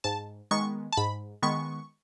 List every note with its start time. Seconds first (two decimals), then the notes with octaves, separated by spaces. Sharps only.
0.04 G#2 A5
0.51 D#3 G#3 B3 C#6
0.92 A5
0.97 G#2 B5
1.42 D#3 G#3 B3 C#6